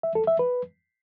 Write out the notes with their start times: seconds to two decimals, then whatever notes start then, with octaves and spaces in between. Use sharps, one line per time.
0.03 E5
0.15 A4
0.27 E5
0.39 B4